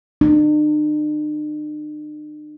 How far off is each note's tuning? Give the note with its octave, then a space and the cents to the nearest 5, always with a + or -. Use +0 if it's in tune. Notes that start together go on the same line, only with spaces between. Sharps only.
D4 +45